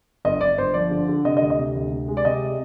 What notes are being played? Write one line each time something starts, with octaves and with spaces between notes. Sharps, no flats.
G1 D#5
G1 D5
G1 C5
F3 D5
D3
D3
C3 D#5
D2 D#5
D#5
C3
D2
C3
G#3
D5
C3 D#5